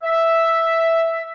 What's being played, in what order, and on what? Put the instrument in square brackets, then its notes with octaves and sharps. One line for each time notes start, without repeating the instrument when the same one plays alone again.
[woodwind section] E5